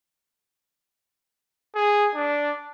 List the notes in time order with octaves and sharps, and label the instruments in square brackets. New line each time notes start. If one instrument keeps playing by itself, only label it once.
[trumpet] G#4
D4